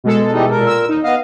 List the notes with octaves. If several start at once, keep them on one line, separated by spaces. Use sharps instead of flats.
B2 G#3 A4
E3 G3 D#4
A#2 A#4
E6
D#2 D#4
B3 D#5 F5